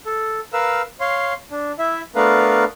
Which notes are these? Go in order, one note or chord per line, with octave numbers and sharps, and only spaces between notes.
A4
A#4 B4 F5 E6
C#5 F5 C6
D4
E4 E5
A3 B3 D4 A#4 B4 F5